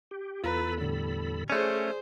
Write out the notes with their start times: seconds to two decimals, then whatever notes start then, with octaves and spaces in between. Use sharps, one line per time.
0.11 G4
0.44 E2 F4 A4 B4 A#5 B5
0.81 A2 D3 G3
1.50 A3 C#4 G#4 C5 D5